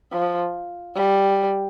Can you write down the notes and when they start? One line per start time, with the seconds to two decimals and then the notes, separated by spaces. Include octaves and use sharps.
0.12 F3
0.96 G3